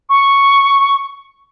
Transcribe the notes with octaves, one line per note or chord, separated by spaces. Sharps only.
C#6